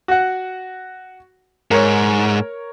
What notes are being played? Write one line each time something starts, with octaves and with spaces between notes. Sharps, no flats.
F#4 F#5
G#2 A#4 C#5